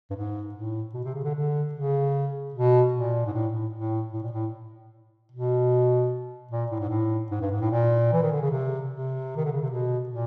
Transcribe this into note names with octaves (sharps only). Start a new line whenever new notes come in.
G2
G#2
A2
B2
C3
C#3
D3
D3
C#3
B2
A#2
G#2
A2
A2
A2
A2
A#2
A2
B2
A#2
A2
G#2
A2
G#2
G2
G#2
A2
A#2
E3
D#3
D3
C#3
C3
C3
D#3
D3
C#3
C3
B2
A#2